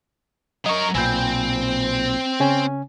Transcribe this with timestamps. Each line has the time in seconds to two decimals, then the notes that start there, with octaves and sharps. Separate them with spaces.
0.66 F#3 A#4 D#5 C#6
0.95 B1 A#2 C4 G#5 B5 G6
2.40 C#3 C#4 G#5